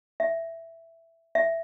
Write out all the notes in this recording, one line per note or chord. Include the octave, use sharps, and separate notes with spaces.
E5
E5